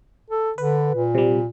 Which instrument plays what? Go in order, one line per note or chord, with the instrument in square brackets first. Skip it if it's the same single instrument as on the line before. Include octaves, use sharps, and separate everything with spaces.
[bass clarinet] A4
[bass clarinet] D3 [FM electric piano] B4
[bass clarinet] A#2
[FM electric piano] C3 G3